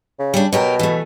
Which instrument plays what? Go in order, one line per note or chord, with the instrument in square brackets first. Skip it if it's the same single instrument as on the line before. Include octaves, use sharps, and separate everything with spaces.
[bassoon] C#3
[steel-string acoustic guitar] G3 D4
[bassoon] B2 [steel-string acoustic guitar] F#3 G4 A#4
[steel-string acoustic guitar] E3 A3